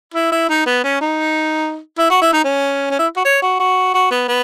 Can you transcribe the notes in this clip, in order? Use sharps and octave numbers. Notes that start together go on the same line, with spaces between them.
E4
E4
D#4
B3
C#4
D#4
E4
F#4
E4
D#4
C#4
C#4
E4
F#4
C#5
F#4
F#4
F#4
B3
B3